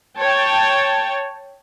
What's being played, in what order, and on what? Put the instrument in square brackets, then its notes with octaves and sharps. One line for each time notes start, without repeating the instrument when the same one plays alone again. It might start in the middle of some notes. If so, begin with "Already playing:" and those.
[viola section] C#5 G5 A5